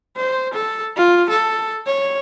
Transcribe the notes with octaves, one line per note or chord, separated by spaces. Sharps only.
C5
A4
F4
A4
C#5